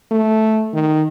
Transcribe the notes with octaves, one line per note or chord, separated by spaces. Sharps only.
A3
D#3